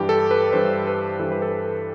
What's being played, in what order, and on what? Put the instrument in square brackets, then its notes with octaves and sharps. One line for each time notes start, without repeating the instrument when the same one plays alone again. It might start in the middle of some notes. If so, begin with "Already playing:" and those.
Already playing: [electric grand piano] G2 E3 G4
A4
B4
G2 E3 C5
B4
G2 E3 A4
B4
A4